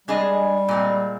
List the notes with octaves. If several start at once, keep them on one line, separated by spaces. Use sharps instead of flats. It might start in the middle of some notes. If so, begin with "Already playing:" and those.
G3 G#3 D4 G#4 D#5
A#2 G#3 C4